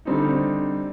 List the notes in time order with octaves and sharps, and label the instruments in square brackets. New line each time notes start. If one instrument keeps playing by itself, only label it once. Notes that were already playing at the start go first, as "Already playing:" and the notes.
[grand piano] D3 G3 C4 D#4